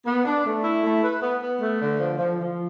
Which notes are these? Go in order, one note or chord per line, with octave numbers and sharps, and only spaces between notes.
B3
D4
A3
E4
A3
B4
B3
B3
A3
D3
F3
F3
F3